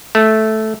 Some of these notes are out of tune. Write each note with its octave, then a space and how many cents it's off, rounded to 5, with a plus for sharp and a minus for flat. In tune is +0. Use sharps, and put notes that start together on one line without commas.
A3 -10